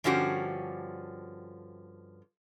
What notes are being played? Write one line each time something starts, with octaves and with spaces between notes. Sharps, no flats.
G2 D3 F3 C#4 F#4 G4